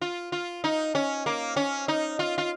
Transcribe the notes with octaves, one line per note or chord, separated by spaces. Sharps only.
F4
F4
D#4
C#4
A#3
C#4
D#4
F4
F4